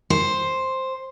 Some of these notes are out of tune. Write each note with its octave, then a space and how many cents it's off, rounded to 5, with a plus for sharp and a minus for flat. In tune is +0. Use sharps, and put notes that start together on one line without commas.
C5 +5